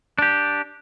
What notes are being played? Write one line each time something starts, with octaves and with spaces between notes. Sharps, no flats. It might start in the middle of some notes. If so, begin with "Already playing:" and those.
D4 G4